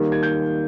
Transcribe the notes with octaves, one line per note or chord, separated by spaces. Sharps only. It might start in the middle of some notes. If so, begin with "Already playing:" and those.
Already playing: D#3 G3 A#3
G#6
G6